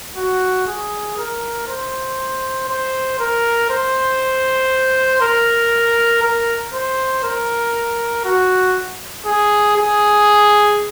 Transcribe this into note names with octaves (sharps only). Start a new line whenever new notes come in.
F#4
G#4
A#4
C5
C5
A#4
C5
A#4
A#4
C5
A#4
F#4
G#4
G#4